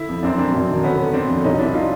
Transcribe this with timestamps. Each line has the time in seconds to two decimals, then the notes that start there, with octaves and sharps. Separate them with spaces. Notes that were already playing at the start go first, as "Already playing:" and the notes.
Already playing: D3 E4
0.09 F2
0.23 F#2 C4 D4
0.38 F#2 C4 D4
0.54 F#2
0.69 D#3
0.83 D3 B3 C#4
0.98 D3
1.13 D3 C4 D4
1.28 F2
1.44 C2 C#4 D#4
1.59 C3 D4 E4
1.74 D#4 F4